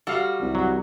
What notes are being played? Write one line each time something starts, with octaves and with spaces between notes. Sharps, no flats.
G3 F#4 A4 F5
C2
F#3